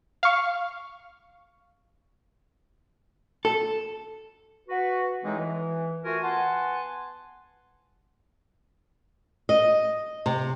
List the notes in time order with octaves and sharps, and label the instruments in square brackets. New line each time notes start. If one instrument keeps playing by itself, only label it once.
[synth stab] F5 C#6
[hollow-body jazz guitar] A4
[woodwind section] F#4 B4
A2 E3 G#3 C4 D#4 G#4
E3
A3 F4 F#4 A#4 G#5
B3 F#5 G#5 A5 C6
[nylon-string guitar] D#5
C3